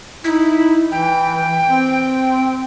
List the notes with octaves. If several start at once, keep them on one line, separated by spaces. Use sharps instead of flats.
D#4 E4
E3 G5
C4